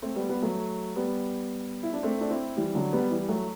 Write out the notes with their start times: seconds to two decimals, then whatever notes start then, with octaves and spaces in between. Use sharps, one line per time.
0.02 A3 C4
0.16 G3 B3
0.29 G3 B3
0.43 F#3 A3
0.96 G3 B3
1.83 E4
1.93 D4
2.03 A3 C4
2.21 D4
2.30 C4 E4
2.57 E3 G3
2.75 D3 F#3
2.93 G3 B3
3.10 E3 G3
3.29 F#3 A3